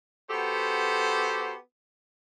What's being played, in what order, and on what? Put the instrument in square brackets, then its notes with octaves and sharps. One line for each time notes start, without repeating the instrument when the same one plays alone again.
[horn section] B3 F#4 G4 A4 C5